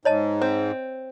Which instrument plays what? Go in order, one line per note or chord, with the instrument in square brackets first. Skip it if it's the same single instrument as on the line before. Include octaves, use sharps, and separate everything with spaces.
[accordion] G#2 [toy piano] C#5 D#5 A5
[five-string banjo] C4